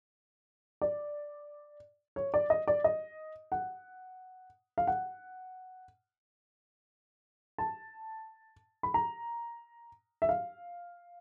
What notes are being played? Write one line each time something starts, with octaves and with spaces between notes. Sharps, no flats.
D5
C#5
D5
D#5
D5
D#5
F#5
F5
F#5
A5
B5
A#5
E5
F5